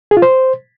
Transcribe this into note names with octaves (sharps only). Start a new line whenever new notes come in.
G#4
F4
C5